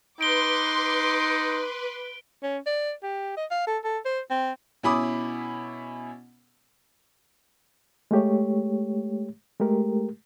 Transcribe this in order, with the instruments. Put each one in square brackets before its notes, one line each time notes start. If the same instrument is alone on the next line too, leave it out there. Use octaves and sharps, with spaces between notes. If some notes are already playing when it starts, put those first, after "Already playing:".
[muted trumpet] D#4 [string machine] B4 [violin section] C6 D6 [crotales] D7 G7
[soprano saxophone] C#4
D5
G4
D#5
F5
A4
A4
C5
C4
[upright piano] B2 C#4 E4 B5 D6 D#6
[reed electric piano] G#3 A3 G4 C#5
G#3 A3 G4 A#4